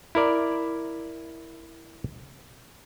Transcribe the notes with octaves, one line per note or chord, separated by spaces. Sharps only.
E4 A#4 D5